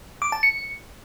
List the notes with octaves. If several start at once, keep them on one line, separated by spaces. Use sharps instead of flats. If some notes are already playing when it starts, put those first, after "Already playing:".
D6
A5
C#7